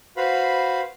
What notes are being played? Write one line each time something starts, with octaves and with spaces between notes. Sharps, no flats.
F#4 B4 C5 F5 B5